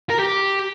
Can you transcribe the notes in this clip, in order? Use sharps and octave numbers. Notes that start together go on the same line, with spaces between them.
A#4
G4